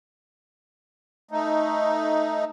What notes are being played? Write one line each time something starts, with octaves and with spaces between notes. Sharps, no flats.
A3 D#4